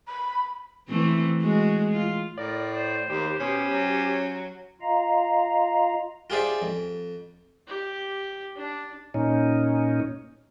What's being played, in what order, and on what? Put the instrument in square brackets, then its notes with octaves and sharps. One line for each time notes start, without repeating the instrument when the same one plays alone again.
[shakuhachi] B5
[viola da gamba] E3 A3 C4
G#3 F#4
F4
[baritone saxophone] A2 [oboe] A#4 [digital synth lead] D5
[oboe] C5
[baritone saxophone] D#2 [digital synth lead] G4
[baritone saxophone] B2 [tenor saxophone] C#4 [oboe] C5
[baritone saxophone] F#3
[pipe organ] F4 D#5 F5 A#5
[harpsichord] F4 G4 G#4 C5 D5 E5
F2
[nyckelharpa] G4
D4
[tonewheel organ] A#2 C#4 D#4